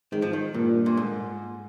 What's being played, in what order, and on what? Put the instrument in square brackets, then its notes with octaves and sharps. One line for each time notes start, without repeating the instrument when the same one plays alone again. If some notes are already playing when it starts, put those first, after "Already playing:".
[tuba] G#2 [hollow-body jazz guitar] D#3
[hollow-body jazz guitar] F3
D#3
[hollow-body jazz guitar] G2 [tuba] A#2
[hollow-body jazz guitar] A#2
G#2